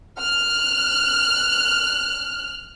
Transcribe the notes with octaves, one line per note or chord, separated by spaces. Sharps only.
F6 F#6